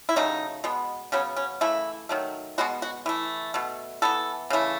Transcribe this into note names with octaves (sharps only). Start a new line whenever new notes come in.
E4
C#3 F#3 A3 D#4
B2 G#3 B3
C#3 F#3 B3 C#4
C#4
C#3 E3 A3 E4
D#3 F#3 A3
B2 G#3 B3 F#4
F#4
E3 A3
B2 A3
E3 B3 A4
C#3 E3 A3